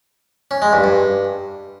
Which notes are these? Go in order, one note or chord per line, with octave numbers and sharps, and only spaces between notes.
C#4
G#3
G2
G2